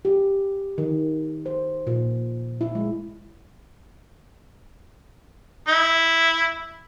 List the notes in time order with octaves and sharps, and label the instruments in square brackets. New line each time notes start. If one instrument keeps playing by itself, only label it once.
[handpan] G4
D#3
C5
A#2
E4
G#3
[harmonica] E4